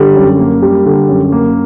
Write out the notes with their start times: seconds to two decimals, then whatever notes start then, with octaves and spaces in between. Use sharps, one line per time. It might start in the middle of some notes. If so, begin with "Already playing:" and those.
Already playing: D3 G3
0.16 F#2
0.39 A#3
0.62 G3
0.86 D3
1.09 F#2
1.32 A#3